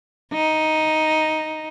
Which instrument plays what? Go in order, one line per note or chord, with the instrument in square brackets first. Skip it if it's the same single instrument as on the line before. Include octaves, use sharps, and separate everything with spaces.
[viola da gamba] D#4